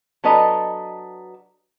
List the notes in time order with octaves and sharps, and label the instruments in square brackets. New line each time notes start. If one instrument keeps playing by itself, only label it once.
[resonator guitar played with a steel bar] F#3 D4 A4 B4 D#5 A#5